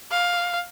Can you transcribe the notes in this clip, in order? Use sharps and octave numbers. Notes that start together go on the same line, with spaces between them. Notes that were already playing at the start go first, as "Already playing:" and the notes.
F5